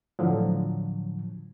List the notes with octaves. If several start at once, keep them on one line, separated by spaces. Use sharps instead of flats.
A2 D3 F3 F#3